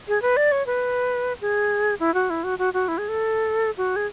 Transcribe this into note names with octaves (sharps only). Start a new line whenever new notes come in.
G#4
B4
D5
C#5
B4
G#4
E4
F#4
E4
F#4
F#4
F#4
E4
G#4
A4
F#4
G#4